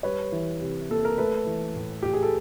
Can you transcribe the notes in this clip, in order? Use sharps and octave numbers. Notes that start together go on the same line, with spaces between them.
G3 B4 C#5
E3
C3
A#3 A4
A#4
A3 A4 B4
E3
A2
A2 G4
G#4
A4